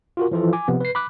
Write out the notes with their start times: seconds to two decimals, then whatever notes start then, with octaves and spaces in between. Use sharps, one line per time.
0.17 F4 F#4 A#4
0.31 E3 F3 E4 F4 A4
0.53 G#5 D6
0.68 C3 F3 B3
0.80 B4 C7
0.95 B5 D6 F#6